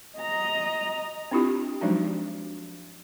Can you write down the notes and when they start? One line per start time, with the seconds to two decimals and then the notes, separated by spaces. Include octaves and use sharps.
0.17 D#5 A#5
1.31 C4 D4 E4 F4 G4
1.81 F3 F#3 G#3 D4 D#4 F#4